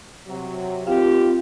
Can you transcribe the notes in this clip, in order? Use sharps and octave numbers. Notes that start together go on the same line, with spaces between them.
C3 F#3
D#2 C4 F4 G4 F5